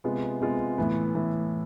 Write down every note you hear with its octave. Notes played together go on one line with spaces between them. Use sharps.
C3 G#3 B3 F4
C3 G#3 B3 F4
A2 E3 B3 E4
A2 E3 B3 E4